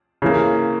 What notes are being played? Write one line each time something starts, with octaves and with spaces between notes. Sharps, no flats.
C#3 E3 A#3